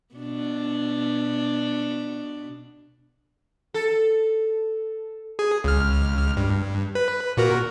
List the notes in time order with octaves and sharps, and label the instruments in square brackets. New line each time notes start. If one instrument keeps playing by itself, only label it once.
[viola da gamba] B2 D4
[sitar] A4
[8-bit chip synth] G#4
C#2 F6
G2
B4
A#2 F#4 A#4